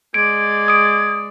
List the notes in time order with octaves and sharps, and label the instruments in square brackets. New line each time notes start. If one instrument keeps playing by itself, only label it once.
[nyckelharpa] G#3 D5 [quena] G#6 [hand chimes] D7
[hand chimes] D#6 D7